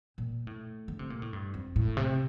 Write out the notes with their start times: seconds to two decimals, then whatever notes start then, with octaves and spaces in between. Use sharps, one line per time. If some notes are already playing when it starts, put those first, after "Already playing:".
0.18 A#2
0.47 A2
0.88 D3
0.99 C3
1.10 A#2
1.22 A2
1.33 G2
1.54 F2
1.76 A2
1.97 C3